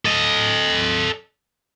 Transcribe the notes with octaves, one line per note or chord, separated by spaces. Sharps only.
A4 D#5